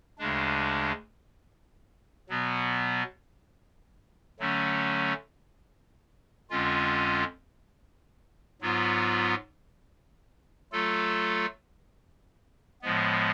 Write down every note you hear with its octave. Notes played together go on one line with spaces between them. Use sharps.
D2 C#3 G#3 D4
B2 F#3 B3
D3 F#3 A3 C#4
F2 D3 G#3 C#4 F4
G#2 F#3 B3 F4
F#3 A3 F4 A4
A2 F3 G#3 B3